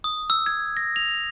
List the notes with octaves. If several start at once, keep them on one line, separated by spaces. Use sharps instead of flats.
D#6
E6
G#6
A#6
F7